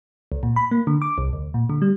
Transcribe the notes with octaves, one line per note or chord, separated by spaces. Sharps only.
C#2
A#2
B5
A#3
D3
D6
C2
D2
A#2
D3
G3